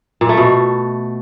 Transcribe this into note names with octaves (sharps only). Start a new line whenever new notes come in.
A#2
A3
B2